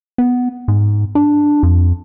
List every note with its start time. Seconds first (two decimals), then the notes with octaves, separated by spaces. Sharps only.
0.18 B3
0.68 G#2
1.15 D4
1.63 F2